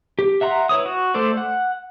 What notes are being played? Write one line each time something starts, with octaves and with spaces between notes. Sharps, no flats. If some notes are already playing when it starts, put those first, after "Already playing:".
G4
E5 F#5 A#5 C6
E4 B4 C#5 D#6
F#4
A3 A4 C5 D5
F#5